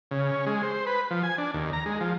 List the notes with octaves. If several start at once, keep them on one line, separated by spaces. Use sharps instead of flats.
C#3
C#4
G#3
C5
B4
F3
G#5
D4
D#2
A#5
G#3
F3